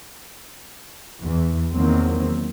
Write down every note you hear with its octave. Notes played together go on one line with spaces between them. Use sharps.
E2 E3
E2 D#3 F#3 A#3 C4